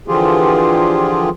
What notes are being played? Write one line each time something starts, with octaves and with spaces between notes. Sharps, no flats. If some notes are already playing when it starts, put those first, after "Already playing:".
D3 E3 F3 F4 G4 G#4